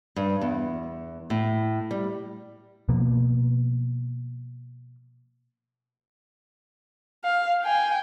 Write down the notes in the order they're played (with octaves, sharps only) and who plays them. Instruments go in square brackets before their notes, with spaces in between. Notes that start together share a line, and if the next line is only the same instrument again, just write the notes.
[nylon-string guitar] G2
E2
A2
G3
[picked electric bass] B2 F3 A#3
[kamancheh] F5
G5 G#5